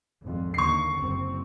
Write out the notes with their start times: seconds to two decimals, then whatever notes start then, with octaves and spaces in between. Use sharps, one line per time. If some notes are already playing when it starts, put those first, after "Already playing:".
0.23 G#1 F2
0.54 D#2 D3 A#3 C#6 C7
0.95 F#1 C4